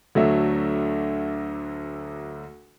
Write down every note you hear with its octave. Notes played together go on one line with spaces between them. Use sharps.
D2 D3 F#3 A3 E5